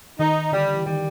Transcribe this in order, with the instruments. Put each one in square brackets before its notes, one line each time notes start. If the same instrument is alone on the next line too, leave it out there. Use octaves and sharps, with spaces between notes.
[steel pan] D#3 [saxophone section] D#4
[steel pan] D3 [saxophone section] G3
[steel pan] E3
[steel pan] D#3 [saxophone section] G3